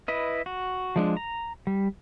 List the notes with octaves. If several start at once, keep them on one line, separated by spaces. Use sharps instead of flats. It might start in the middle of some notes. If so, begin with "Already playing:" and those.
E4 B4 D#5
F#4
F3 G#3 D4
A#5
G3